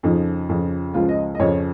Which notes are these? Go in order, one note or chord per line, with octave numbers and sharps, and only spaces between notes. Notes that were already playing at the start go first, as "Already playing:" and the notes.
F2 C#3 F3 D#4
F2 C#3 F3
C#2 C#3 F3 F4
D#5
D#5
F2 C#3 F3 C#5